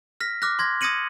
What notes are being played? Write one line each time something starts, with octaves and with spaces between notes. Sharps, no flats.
F6 A#6 B6
D6 F6 F#6 A#6
C6 G#6 A#6
D#6 G#6 A#6 C#7 D#7 F#7